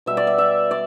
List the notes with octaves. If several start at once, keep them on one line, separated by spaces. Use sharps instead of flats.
B2 G3 E5
D5
E5
E5
D5